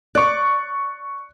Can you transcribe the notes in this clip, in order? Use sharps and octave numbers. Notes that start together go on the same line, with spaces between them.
D5 C#6 F#6